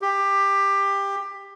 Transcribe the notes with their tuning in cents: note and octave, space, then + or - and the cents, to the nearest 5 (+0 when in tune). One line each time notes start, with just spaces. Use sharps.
G4 +15